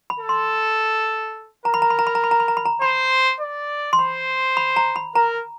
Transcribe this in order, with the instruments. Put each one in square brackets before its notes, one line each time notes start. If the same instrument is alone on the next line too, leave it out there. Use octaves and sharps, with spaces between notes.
[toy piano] B5
[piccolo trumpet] A4
[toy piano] C6
[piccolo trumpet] A#4 [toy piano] A#5
[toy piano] B5
A#5
B5
A#5
B5
A#5
B5
A#5
B5
A#5
B5
A#5
[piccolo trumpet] C5 [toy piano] B5
[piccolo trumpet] D5
[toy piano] C6
[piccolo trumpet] C5 [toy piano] B5
[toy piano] B5
A#5
B5
[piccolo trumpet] A#4 [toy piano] A#5